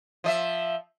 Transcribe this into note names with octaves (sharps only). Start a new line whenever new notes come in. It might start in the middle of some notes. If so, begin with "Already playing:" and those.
F3 D#5 E5